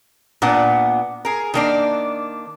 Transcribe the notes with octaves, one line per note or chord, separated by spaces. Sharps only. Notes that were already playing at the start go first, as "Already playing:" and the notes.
A#2 B3 D4 F#5
G#4 A#4
D#3 A#3 D4